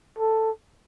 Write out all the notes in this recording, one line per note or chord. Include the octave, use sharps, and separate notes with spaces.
A4